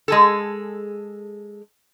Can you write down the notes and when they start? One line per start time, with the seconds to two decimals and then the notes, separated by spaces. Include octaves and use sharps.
0.08 G#3 G#4 A4